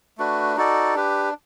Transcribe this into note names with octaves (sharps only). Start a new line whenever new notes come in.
A3 D4 F#4 B4
D#4 F#4 A4 D5
D4 G4 B4